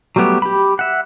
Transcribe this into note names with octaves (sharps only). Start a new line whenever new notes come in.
F#3 G3 A3 B3 G4
G4 B5
E5 F#5